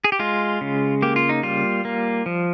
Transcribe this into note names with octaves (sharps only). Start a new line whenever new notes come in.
G#4
G4
G#3 F4
C#3
A#3 G4
F4
D#4
G3 F4
A#3
F3